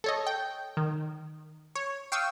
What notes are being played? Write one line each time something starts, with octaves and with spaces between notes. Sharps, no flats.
A4 C#5 D#5
G5
D#3
C#5
F5 G5 C#6 D#6 E6